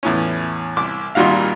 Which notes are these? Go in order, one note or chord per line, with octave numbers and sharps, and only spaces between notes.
E2 A2 C#4
C2 D6
G#1 A#2 D#3 G3 F#4 F5